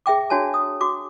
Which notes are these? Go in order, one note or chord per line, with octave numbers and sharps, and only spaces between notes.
G#4 E5 G5 D6
D4 F#4 C#5 G#5 A5
D#6
F#4 D6